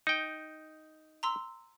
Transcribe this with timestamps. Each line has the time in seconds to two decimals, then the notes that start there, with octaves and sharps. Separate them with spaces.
0.07 D#4 G5
1.23 A#5 C6 E6